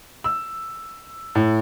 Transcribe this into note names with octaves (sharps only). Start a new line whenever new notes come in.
E6
A2